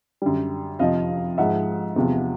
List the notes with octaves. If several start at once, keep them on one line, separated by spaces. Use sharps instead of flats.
F#2 D3 G3
F2 C3 F3 D#5 F5
G#2 F3 G#3 E5 F#5
E2 C3 F3